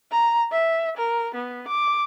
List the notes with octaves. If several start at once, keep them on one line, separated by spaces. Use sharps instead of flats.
A#5
E5
A#4
B3
D6